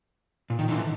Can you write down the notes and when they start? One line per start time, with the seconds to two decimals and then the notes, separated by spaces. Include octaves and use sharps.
0.50 A#2
0.59 D#3
0.69 D3 E3